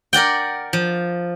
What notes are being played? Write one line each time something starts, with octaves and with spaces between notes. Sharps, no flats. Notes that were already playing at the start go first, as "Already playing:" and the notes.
A#4 D5 F#5 G5
F3